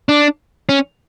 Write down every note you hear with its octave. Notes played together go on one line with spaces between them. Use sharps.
D4
C#4